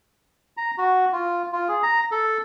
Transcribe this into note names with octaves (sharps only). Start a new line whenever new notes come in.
A#5
F#4
F4
F4
G#4
A#5
A4